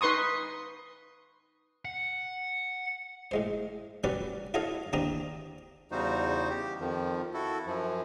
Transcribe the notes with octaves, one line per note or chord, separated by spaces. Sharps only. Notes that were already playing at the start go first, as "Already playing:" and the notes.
D#4 B4 C6 C#6 D#6
F#5
A2 G#3 C5
F#3 G3 C#4 F#4 B4 D5
E4 F#4 A4 C#5 D#5 F5
D#2 C4 D4 G5 A#5 D#6
E2 C#3 G3 D#4 F#4 C5
G4
F2 D#3 F3
E4 F#4 A4
F#2 F3